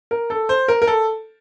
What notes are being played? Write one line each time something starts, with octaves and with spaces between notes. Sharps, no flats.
A#4
A4
C5
A#4
A#4
A4